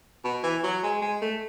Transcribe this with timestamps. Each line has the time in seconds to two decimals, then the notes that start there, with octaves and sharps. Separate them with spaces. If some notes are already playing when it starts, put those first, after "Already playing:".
0.24 B2
0.43 E3
0.63 F#3
0.83 G#3
1.02 G#3
1.22 A3